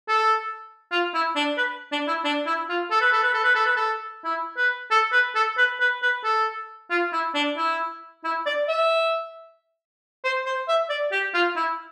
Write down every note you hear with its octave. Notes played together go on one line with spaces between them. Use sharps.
A4
F4
E4
D4
B4
D4
E4
D4
E4
F4
A4
B4
A4
B4
A4
B4
A4
B4
A4
E4
B4
A4
B4
A4
B4
B4
B4
A4
F4
E4
D4
E4
E4
D5
E5
C5
C5
E5
D5
G4
F4
E4